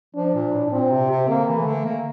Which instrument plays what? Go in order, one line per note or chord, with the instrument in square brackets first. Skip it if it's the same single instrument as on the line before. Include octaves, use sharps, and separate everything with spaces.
[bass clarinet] F3 [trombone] D4
[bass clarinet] A#2
A2
A2
[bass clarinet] A#2 [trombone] C4
[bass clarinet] C3
C3
[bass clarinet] D3 [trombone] A#3
[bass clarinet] E3
[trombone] A3
[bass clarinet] D3
A#3